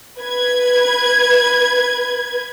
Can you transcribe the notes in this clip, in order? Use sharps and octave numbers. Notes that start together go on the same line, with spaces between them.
B4 G#6